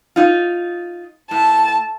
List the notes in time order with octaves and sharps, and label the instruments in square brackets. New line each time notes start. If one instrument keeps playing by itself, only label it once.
[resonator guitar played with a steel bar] D#4 F4
[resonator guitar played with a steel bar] A2 [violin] A5